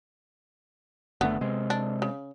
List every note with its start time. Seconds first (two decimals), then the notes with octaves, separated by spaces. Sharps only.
1.21 F#1 D3 A3 B3
1.41 C3 G#3
1.70 D4
2.02 C#3